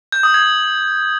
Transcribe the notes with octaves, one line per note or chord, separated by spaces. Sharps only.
G6
D#6
G#6